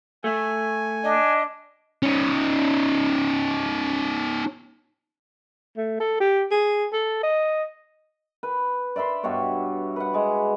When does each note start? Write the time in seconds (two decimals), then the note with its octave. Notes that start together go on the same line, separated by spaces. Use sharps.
0.24 A3 G#5
1.04 D4 D#5
2.03 C#4 D#4
5.76 A3
6.00 A4
6.20 G4
6.51 G#4
6.93 A4
7.23 D#5
8.43 B4
8.96 D5 E5 B5 C6
9.23 G2 B2 F#4 C#5
9.96 B4 F#5
10.13 G#3 D6